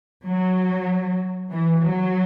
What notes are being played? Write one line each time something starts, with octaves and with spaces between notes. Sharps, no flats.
F#3
E3
F#3